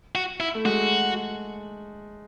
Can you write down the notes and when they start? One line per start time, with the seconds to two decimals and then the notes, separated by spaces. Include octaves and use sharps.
0.15 F#4
0.40 E4
0.55 A3
0.65 G#3 F#4